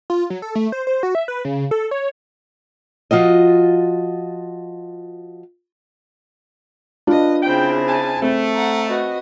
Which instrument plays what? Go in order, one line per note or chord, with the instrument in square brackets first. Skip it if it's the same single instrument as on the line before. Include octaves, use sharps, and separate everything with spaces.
[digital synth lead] F4
F#3
A4
A3
C5
C5
F#4
E5
B4
C#3
A4
C#5
[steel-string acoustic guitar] F3 F4 F#4 D#5
[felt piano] D4 F4 [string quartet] B4 D#5
[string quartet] C#3 C4 E4 [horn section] G5
[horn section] G#5 A5
[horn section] A3 [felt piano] C4
[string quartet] F#5 A#5
F#4 B4 D#5